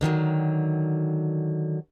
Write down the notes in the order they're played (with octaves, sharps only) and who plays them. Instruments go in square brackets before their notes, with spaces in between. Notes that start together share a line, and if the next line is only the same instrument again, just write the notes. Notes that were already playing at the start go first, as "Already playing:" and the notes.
[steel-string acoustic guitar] D3 D#3 F3 F#3